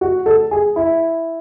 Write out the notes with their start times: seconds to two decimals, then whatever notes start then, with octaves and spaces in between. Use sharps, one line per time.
0.01 F#4
0.26 A4
0.51 G#4
0.76 E4